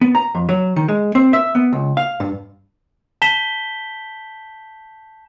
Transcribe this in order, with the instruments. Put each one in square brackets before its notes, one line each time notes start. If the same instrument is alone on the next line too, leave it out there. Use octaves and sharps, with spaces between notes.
[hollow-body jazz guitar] B3
A#5
F2
F#3
D#3
G#3
C4
E5
B3
C#2
F5
G2
[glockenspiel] A5 G6 B6 E7 G7